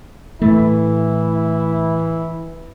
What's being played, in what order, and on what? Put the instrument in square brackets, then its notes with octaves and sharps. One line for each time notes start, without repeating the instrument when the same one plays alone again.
[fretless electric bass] A2 A3 [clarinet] E3 [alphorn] E4